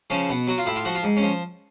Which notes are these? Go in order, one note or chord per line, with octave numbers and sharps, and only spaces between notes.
C#3 F3 C#4
B2 B3
F#3 F#4
F4
A2 E4
F4
F3 F#4
F4
G#2
C#4
F3